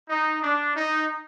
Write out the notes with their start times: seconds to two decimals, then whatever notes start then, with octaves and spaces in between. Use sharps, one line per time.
0.09 D#4
0.43 D4
0.76 D#4